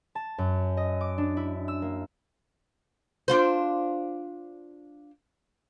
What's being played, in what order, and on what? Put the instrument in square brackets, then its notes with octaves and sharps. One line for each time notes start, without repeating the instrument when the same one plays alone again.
[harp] A5
F#2
D#5
D6
D4
E4
E6
A#3
[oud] D4 F4 C5